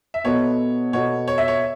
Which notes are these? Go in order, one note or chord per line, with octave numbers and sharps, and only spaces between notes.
E5
B2 B3 F#4 A4 C#5
B2 B3 F#4 A4 C#5
C#5
E5
C#5